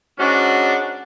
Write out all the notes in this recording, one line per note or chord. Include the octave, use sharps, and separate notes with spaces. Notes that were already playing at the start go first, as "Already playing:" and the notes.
G#2 C#4 D4 F#4